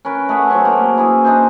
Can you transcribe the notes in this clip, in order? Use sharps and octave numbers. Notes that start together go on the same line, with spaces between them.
C#4 A#4 B4
A3 G#4 E5 F#5
F#3 C4 C#4
A#3
E4 G#4
D4 D#4 G#4 C5